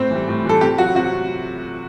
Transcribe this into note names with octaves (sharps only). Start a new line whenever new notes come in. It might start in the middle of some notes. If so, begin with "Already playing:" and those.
Already playing: A2 C4 C5
E3 G3
A2
E3 G3 A4
C3 G4
F#3 F#4
C3 F#4